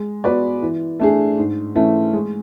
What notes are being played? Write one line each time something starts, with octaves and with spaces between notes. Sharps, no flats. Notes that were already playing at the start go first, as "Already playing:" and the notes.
Already playing: G#3
B3 F#4 B4 D5
E3
A3 D4 G#4
G#2
E3 A3 C#4
G#3